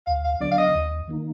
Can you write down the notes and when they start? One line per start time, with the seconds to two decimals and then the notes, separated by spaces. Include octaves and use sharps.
0.07 D2 F5
0.24 F5
0.40 D3 F#3 B3 D4 D5
0.51 F5
0.58 D#5
0.74 D#2
1.07 D#3 A#3 D#4